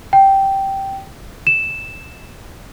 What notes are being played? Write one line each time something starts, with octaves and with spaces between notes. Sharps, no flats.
G5
E7